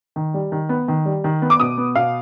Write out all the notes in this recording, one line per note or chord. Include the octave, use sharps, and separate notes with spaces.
D#3
G3
D#3
B3
D#3
G3
D#3
B3
D6
B2 D#6
B3
B2 F5